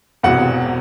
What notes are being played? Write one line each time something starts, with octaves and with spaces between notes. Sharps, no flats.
E1 E2 C3 F#3 F#5